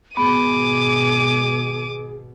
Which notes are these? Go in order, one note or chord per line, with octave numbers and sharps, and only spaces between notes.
G#1 B2 B3 G#4 D6 D#7